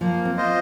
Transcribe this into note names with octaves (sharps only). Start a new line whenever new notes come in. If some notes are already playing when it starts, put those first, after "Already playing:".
F3 A#3
C4
F4 C5 D#5